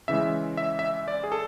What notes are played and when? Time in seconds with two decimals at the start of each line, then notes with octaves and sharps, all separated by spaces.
0.08 C#3 E3 G#3 E5
0.57 E5
0.79 E5
1.08 D5
1.24 G#4
1.32 A4